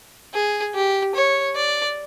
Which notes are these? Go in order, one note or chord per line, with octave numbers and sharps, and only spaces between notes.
G#4
G4
C#5
D5